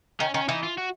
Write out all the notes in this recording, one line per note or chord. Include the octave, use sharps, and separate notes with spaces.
D#3 C#4
D#3 C#4
E3 D#4
F4
F#4